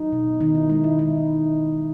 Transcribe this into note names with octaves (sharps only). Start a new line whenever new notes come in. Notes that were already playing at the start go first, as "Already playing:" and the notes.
Already playing: F#3 D#4
B2
D#3 D#4
E4
G#3 D#4
E4
D#3 D#4